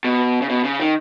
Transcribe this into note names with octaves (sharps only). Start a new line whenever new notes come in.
B2
C#3
B2
C#3
D#3